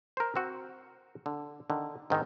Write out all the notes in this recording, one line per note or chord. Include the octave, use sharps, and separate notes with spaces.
A#4 C5
C4 F#4
D3
D3 D#3
G#2 D#3 C4 D#4